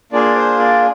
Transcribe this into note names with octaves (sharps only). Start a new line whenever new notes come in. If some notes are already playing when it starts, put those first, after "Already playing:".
A#3 D4 F4 G#4 D5
C5
D5